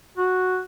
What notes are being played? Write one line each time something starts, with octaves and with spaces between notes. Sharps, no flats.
F#4